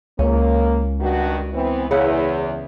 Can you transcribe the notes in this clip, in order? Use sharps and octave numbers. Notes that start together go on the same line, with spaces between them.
C#2 A#3 C#4
G2 D#3 F#4
E3 B3 C4
E2 C#3 E4 F#5